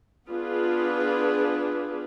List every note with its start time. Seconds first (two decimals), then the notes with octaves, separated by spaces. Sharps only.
0.29 B3 D4 F4 G#4 B4